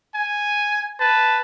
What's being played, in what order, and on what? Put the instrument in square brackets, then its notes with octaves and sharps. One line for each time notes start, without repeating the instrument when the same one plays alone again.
[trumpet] G#5
[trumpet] B4 [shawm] A5